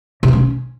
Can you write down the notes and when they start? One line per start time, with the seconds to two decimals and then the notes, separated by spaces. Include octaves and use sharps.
0.23 C3
0.28 F3
0.33 C#4